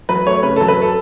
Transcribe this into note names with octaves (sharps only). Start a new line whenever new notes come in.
F#3 B4
A3 C#5
C#3 B4
A4
F#3
B4
A4